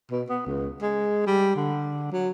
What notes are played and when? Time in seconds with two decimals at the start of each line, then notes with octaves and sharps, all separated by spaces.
0.11 B2
0.29 B3
0.46 C#2
0.81 G#3
1.26 G3
1.56 D3
2.12 F#3